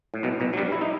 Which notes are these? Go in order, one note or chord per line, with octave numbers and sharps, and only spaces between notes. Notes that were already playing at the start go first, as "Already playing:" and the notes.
A2
B1 B2
B1 B2
F#3
G2 G3
E4
D#4